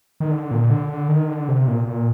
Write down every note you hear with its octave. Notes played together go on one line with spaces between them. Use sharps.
D#3
D3
A#2
D3
D3
D#3
D3
C3
A#2
A#2